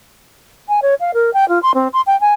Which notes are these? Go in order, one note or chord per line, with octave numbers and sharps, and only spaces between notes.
G#5
C#5
F5
A#4
G5
F4
C6
C4
C6
G5
G#5